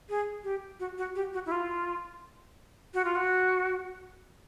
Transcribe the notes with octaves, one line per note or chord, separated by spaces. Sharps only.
G#4
G4
F#4
F#4
G4
F#4
E4
F4
F#4
F4
F#4